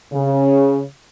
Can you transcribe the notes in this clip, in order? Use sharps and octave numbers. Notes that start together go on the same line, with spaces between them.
C#3